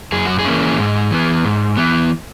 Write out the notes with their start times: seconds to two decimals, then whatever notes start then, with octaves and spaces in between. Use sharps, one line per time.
0.12 F#2 G#4
0.25 F#4
0.39 G#4
0.45 E3 A#3 C#4
0.78 G#2
1.11 E3 B3
1.44 G#2
1.77 E3 B3